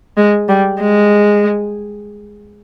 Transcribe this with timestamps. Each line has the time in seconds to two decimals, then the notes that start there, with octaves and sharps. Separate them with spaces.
0.17 G#3
0.49 G3
0.80 G#3